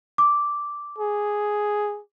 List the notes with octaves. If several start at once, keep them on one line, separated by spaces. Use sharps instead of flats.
D6
G#4